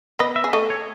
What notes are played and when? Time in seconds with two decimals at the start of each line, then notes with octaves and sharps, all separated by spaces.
0.19 B3 B4 D#5
0.36 E5
0.44 G#4
0.53 A3 A4 D#5
0.70 C#5